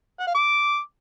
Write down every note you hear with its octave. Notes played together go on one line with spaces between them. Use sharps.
F#5
F5
D6